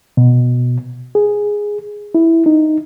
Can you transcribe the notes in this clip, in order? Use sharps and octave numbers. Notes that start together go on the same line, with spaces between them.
B2
G#4
E4
D#4